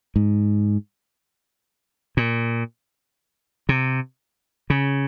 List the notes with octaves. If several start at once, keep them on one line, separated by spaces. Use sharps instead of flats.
G#2
A#2
C3
C#3